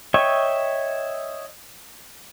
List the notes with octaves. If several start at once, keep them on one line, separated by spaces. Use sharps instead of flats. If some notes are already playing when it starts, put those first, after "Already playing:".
C#5 D#5 E5 G5 C#6